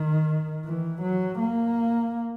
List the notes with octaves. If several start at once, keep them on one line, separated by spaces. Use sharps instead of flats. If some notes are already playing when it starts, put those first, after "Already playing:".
Already playing: D#3
E3
F#3
A#3